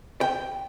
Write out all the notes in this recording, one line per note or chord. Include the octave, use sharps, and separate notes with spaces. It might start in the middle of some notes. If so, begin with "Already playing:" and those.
G5